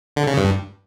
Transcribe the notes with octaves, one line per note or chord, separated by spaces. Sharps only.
D3
C#3
G2